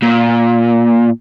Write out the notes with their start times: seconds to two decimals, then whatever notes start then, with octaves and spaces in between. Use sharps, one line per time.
0.02 A#2